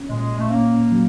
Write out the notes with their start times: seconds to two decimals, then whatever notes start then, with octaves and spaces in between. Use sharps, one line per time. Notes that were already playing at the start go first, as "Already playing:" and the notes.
Already playing: C#4
0.09 A#2 G#3
0.39 A3
0.50 A#3 C#4
0.91 F#3